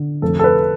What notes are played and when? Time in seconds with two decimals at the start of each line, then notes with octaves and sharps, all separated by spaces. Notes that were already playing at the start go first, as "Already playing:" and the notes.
Already playing: D3
0.22 F1 A4
0.39 A4
0.44 B4